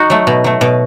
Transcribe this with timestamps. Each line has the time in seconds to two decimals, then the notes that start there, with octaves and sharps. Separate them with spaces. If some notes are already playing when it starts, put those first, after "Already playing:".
Already playing: D#4 F#4
0.10 F#3 A3
0.27 B2
0.44 F#3 A3
0.61 B2